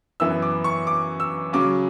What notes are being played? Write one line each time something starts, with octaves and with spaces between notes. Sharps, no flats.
F#2 E3 B3 E4 E6
D6
C#6
D6
E6
C#3 F#3 C#4 D6